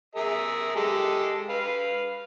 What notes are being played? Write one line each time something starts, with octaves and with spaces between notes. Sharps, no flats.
G#4 A#4 E5
G#3 G4 A4
B4 F5